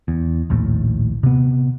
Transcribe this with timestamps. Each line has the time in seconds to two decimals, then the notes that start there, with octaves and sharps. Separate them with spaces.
0.08 E2
0.50 A#1 D#2 A2
1.23 C3 B3